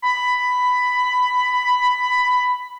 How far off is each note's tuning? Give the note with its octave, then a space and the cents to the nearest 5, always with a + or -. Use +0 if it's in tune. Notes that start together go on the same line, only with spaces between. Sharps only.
B5 +10